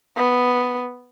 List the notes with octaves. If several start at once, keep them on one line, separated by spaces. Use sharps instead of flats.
B3